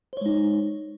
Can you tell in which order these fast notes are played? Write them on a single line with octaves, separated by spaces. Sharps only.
C5 C#5 G#3 D#4